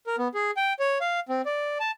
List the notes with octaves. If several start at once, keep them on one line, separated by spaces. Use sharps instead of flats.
A#4
B3
G#4
G5
C#5
F5
C4
D5
A5